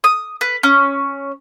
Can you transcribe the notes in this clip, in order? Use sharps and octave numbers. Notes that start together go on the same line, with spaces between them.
D#6
B4
C#4